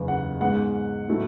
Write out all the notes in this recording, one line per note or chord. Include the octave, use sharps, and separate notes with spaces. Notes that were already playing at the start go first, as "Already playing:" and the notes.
Already playing: F#1 E2 C#3
F#5
G#2 G#3 B3 F#5
A2 F#3 A3